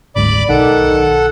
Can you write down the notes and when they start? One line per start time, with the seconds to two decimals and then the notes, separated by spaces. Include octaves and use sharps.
0.16 F#1 D2 G#2 D5 B5 D6
0.49 B1 D#3 A4 F#5